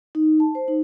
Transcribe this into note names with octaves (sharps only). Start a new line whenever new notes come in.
D#4
A5
C5
D#4